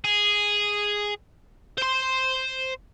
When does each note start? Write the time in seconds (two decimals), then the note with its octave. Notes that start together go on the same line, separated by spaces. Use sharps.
0.04 G#4
1.78 C5 C6